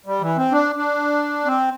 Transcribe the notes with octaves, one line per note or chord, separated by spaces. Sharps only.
G3
E3
C4
D4
D4
C4